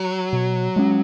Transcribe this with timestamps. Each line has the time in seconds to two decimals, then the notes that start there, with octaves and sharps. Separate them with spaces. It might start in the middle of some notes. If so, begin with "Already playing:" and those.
Already playing: F#3
0.33 B2
0.76 G#3 C#4